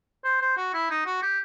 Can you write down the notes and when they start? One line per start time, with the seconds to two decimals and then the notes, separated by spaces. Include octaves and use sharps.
0.24 C5
0.42 C5
0.57 F#4
0.74 E4
0.90 D#4
1.06 F#4
1.23 G4